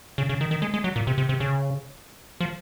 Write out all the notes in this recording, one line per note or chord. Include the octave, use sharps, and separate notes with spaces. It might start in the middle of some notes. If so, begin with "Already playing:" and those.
C#3
C#3
D#3
D#3
G#3
G#3
F#3
A#2
C3
C3
C3
C#3
F3